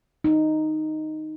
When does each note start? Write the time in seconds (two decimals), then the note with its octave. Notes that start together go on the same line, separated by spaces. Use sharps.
0.24 D#4